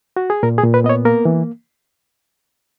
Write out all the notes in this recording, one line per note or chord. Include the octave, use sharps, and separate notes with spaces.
F#4
G#4
A#2 A#4
G#4
A#2
B4
B3 D#5
C#5
A#3 A#4
E3